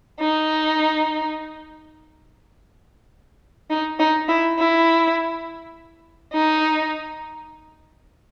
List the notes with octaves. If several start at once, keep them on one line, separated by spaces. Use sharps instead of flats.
D#4
D#4
D#4
E4
E4
D#4